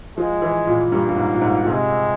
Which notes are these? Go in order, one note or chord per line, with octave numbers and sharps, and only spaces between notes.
F3 G#3
E3
A#2
G2 A#3
G2
G#2
A#2
G#2
A#2
C3 G#3